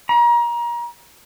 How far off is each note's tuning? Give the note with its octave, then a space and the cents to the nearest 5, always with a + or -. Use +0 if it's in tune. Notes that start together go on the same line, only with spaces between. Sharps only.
A#5 +30